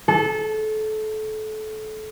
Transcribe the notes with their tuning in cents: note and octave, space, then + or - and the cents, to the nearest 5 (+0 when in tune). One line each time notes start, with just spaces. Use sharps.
A4 -25